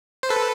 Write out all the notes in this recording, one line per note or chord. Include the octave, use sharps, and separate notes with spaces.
C5
A4 B4